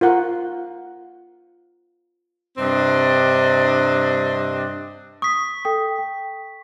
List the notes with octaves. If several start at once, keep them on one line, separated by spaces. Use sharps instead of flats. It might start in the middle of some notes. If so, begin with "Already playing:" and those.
F4 A#4 F#5
G2 C3 C4 D4 D#5
C#6 D#6 B6
A4 G5 D#6
G5